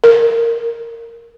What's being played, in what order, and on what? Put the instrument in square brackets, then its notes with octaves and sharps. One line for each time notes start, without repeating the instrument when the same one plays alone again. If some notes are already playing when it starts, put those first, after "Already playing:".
[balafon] A#4